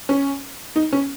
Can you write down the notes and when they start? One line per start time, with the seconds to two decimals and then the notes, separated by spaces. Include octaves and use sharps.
0.09 C#4
0.76 D#4
0.92 C#4